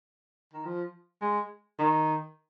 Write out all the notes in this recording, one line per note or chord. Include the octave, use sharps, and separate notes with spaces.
D#3
F3
G#3
D#3